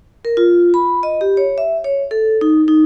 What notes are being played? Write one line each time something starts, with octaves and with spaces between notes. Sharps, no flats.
A#4
F4
B5
D#5
G4
C#5
E5
C#5
A4
D#4
D#4